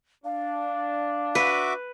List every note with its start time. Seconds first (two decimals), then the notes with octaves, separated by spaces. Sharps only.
0.25 D4 F5
1.35 F#4 B4 E5 D6